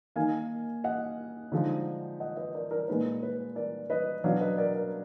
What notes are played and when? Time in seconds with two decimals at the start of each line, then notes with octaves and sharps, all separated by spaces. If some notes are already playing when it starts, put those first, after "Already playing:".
0.16 D#3 A#3 D#4 F5 G#5
0.84 D#5 F#5
1.52 D3 F3 G#3 D#4
2.20 D#5 F#5
2.37 B4 D#5
2.54 A#4 D5
2.71 A#4 D5
2.88 A#2 G#3 B3 D#4 B4
3.22 B4
3.55 A#4 D5
3.90 B4 D#5
4.24 B2 F#3 B3 D4 D5 F5
4.41 B4 D#5
4.58 A#4 D5
4.75 A#4 D5